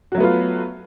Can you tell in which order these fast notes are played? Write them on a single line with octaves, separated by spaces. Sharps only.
F#4 F#3 A3 B3 F4